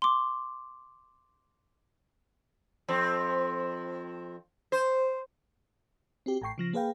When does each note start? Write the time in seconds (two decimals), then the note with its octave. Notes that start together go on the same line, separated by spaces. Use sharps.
0.02 C6 D6
2.88 F2 C4
4.72 C5
6.26 C4 F#4 G4
6.42 A1 A2 G5 C#6 C7
6.58 C#3 F3 A#6
6.73 A#3 G#4 B4 F5 G5